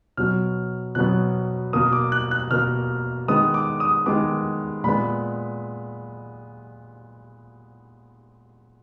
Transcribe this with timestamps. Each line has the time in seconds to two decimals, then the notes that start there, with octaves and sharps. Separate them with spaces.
0.17 B2 F#3 B3 F6
0.95 B2 F#3 B3 F#6
1.73 B2 A#3 D#6
1.93 D6
2.12 F#6
2.31 F#6
2.51 B2 A#3 F6
3.28 D#3 G#3 B3 D#6
3.54 D6
3.80 D#6
4.06 D#3 G#3 B3 D6
4.84 A#2 G#3 B3 B5